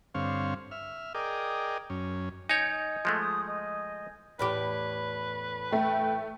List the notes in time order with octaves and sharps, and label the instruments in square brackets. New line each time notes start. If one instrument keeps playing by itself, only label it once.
[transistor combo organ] G2 D3 C4 C#5 F5
E5 F6
G#4 A#4 D5 D#5 G5
F#2 C#4
[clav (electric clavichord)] D#4 C#5 [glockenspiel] G#5 G6 G#6
[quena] D#5
[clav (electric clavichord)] F3 G#3 A3
[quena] D#6
D#5
[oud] E2 A2 G4 [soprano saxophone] B4
[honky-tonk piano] A3 [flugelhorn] G5